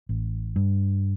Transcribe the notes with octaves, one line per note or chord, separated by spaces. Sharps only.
A1
G2